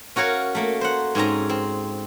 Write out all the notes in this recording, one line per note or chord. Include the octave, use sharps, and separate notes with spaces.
C#4 F#4 A#4 C#5 F5
A3 A#3
C5 F#5
G#2 C4 C#4 A#5
C4